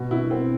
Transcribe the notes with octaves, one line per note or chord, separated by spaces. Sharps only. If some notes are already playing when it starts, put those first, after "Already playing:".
Already playing: B2
B2 E4
B2 C4